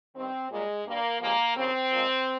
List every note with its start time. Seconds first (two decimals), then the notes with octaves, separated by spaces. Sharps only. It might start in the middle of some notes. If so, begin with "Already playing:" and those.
0.15 G2 D#3 G3 C4
0.50 A#2 G3 G#3
0.86 G2 G3 A#3
1.21 G2 F3 G#3 A#3
1.56 D#2 C#3 F3 C4
1.91 A#2 F3 G#3